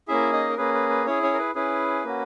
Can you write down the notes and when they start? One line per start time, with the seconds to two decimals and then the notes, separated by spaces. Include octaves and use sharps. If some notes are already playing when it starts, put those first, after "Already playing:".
0.08 A#3 C#4 E4 G#4 E5
0.33 D#4 D#5
0.49 A#4
0.57 A#3 C#4 G#4 B4
0.74 B4
0.90 B4
1.06 C#4 E4 G#4 C#5
1.23 C#4 C#5
1.34 A#4
1.39 B4
1.55 C#4 E4 G#4 B4
2.04 A#3 C#4 F#4